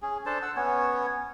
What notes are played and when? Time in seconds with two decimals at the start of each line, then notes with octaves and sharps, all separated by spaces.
0.02 C#4 G#4
0.26 D4 A4 C5 A5
0.42 F#5 E6
0.56 B3 C#4 C#5